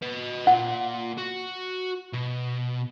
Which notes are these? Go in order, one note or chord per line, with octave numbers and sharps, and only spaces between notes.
B4 D#5
A#2 F4 F#5
F#4
B2